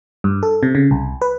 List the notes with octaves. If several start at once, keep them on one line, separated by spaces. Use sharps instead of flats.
G2
A4
C3
C#3
C2
B4